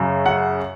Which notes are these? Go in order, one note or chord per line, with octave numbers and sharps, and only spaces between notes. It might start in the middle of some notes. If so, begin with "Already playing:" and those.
Already playing: F#2 C#3
F#5